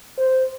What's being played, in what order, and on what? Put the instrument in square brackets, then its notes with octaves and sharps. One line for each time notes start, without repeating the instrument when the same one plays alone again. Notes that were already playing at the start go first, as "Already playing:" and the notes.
[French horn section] C5